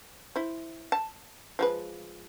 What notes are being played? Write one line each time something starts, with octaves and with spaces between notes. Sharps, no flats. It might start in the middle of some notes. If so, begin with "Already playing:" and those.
E4 C5
A5
F3 G#3 B4